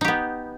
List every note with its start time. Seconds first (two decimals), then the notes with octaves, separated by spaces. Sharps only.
0.01 D#4
0.05 G4
0.08 B3